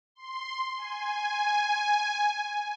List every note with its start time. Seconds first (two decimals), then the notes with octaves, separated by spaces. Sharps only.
0.15 C6
0.77 G#5